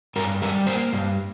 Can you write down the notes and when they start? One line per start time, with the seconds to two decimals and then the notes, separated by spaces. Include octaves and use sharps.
0.16 G2 A#4
0.42 G3 A#4
0.67 A#3 C5
0.93 G2